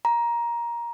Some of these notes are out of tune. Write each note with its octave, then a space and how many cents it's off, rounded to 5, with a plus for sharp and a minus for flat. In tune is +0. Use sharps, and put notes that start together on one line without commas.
A#5 +15